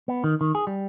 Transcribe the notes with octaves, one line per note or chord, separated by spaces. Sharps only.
B3
D#3
D#3
G#4
G3